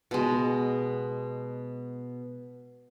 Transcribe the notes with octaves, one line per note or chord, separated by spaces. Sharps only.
B2 G#3